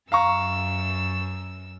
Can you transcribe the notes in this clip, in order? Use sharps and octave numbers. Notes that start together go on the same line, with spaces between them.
F#2 F5 A#5 C#6 E6